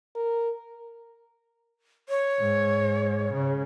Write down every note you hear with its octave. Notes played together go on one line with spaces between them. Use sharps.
A#4
C#5
G#2
C#3